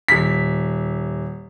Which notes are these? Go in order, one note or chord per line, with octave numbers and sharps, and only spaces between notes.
D#1 B6